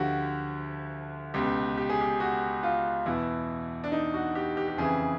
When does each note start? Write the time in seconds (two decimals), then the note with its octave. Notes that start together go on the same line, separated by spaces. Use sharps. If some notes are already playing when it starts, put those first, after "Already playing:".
Already playing: D2 D3 F3 F#4 G4
1.34 C#2 B2 G4
1.77 G4
1.89 G#4
2.01 G4
2.20 F#4
2.63 F4
3.06 E2 B2 E4
3.84 D4
3.92 D#4
4.14 F#4
4.35 G4
4.57 G4
4.68 G4
4.78 F2 C#3 E3 G#4